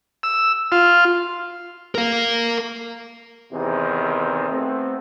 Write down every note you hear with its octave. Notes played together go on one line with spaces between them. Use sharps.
E6
F4
A#4 F5
E2 C3 D#3 C4 D#4
A3 B3 C4